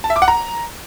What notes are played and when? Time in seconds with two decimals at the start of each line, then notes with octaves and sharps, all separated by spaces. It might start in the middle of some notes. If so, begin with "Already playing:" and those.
0.04 A5
0.10 E5
0.16 D6
0.22 F#5
0.28 A#5